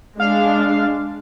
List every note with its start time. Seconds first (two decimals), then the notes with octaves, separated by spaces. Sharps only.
0.20 G#3 D4 F5